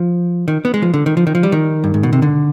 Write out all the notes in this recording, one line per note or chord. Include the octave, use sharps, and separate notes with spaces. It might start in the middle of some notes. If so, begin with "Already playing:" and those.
Already playing: F3
D#3
B3
G#3
F3
D3
D#3
F3
D#3
F3
G3
D#3
G2
G#2
B2
C3
D3